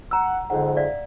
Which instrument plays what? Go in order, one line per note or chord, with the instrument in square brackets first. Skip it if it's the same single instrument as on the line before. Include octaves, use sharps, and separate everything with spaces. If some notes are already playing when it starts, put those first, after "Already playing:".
[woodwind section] F#5 [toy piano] A#5 E6
[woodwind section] F2 G#2 D3 [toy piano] F#5
[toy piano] D5 E5 F5